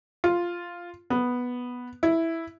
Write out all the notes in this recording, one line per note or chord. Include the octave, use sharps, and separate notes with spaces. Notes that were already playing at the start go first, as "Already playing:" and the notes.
F4
B3
E4